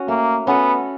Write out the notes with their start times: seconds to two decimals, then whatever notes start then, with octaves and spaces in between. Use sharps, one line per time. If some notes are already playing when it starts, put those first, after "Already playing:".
Already playing: C#4 F#4
0.08 A3 A#3
0.47 B3 C#4 F#4 A4